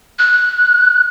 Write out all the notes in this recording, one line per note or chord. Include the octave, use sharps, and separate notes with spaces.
F#6